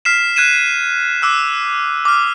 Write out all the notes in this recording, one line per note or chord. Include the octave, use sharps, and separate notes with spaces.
F6 B6 C7 E7
F#6 G#6 D#7 E7
D6 E6 F#6
D6 F6